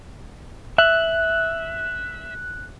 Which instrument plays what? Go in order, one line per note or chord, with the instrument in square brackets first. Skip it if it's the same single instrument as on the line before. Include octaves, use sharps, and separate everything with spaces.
[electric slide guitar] E5 [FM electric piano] F#6